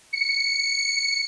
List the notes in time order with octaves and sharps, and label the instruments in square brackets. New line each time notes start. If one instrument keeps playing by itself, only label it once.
[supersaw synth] C#7